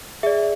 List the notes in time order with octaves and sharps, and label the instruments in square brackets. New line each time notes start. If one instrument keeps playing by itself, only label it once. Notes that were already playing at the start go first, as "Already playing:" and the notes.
[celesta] G#4 D5 E5